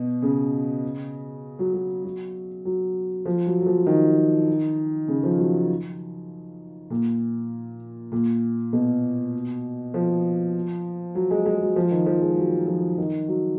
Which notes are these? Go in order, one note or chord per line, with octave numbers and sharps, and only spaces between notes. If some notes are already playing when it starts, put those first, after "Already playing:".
Already playing: B2
C#3
F#3
F#3
F#3
F#3
F3
F#3
F#3
F3
D#3
C#3
F3
F#3
A#2
A#2
B2
F3
F#3
G#3
G#3
F#3
F3
D#3
F3
G#3
F#3
F3
D#3
F#3